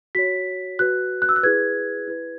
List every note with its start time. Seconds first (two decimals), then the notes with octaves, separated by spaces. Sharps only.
0.15 F#4 C#5 B6
0.79 F#4 B4 F#6
1.22 F#6
1.29 E6
1.36 F#6
1.43 E4 G#4 B4 G#6
2.07 E4 B4